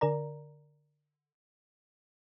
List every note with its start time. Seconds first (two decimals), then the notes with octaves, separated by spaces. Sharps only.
0.01 D3 A#4 D5 A#5